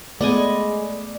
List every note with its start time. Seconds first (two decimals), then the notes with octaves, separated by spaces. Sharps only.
0.21 G#3 A3 B3 D5 D#5 G#5